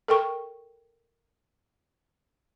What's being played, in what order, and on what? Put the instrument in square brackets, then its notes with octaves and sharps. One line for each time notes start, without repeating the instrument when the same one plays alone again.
[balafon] A4 A#4 G5 C#6